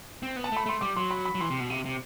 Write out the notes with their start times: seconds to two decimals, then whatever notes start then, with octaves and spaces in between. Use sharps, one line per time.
0.23 C4
0.36 B3
0.44 A5
0.52 A3 B5
0.66 A3 C6
0.81 G3 D6
0.96 F#3 C6
1.11 B5
1.25 B5
1.35 F#3
1.41 E3 C6
1.50 C3
1.60 B2
1.70 C3
1.85 C3